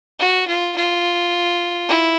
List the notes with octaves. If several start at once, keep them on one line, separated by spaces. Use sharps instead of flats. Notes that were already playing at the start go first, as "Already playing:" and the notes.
F#4
F4
F4
E4